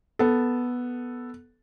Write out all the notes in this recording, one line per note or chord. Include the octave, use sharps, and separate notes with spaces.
B3 A4